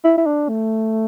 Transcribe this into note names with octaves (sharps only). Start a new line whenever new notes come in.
E4
E4
D4
A3